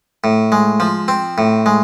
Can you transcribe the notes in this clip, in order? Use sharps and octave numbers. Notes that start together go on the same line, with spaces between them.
A2
G#3
F3
C4
A2
G#3